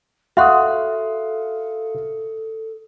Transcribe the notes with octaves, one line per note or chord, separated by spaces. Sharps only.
F#4 A4 E5 F5 C6 D#6 F#6